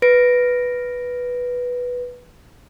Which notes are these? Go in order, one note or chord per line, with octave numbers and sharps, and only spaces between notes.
B4 A#6 D7